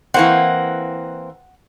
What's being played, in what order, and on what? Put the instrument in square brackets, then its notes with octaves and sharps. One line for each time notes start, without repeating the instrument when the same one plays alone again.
[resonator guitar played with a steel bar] E3 A#3 C4 [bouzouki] F#5